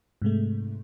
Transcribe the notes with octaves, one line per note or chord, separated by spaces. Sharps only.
G#2 C3 G#3 A3